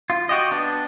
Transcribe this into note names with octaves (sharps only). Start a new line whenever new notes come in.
F4
F#4 G4 D#5
B3 D4